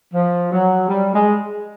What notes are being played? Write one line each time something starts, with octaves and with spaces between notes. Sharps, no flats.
F3
F#3
G3
G#3